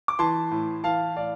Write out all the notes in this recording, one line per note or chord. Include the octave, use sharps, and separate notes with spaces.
D6
E3 A5 C6
A2
E3 F5 A5
A2 D5 F5